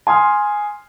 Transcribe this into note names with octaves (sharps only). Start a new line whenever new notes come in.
G#5 C6 D#6 F6